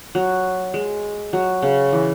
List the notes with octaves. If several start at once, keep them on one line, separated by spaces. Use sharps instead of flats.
F#3
G#3
F#3
C#3
E3